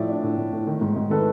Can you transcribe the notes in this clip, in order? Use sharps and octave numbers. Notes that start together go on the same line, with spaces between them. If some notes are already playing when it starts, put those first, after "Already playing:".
Already playing: A2 F3 D5 E5
D4
A2
A2
A2
D#3
G#2
G#2
D#3 A4 B4